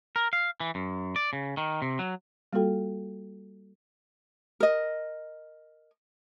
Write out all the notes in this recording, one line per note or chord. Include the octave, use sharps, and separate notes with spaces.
A#4
F5
E3
F#2
D5
C#3
D#3
C3
F#3
G3 A#3 F4 F#4 A4 G5
A#4 D#5